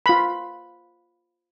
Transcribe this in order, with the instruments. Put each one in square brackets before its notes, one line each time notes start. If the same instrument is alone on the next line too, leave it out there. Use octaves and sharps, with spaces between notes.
[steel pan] F4 B5